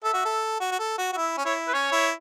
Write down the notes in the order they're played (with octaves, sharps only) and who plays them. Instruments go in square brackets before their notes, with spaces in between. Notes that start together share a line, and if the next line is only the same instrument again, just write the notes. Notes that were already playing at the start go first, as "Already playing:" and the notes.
[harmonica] A4 [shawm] E5
[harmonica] F#4
A4
F#4
F#4
A4
F#4
F#4
[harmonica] E4 [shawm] E5
[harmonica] C#4
[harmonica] E4 [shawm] C#5
[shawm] B4
[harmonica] C#4 [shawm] C#5
[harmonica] E4